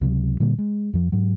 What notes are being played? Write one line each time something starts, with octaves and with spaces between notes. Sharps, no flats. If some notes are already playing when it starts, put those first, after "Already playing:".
C#2 C3 F3 F#3
A#2 D3 G3 A#3
G#3
F2 F3
G#2 F#3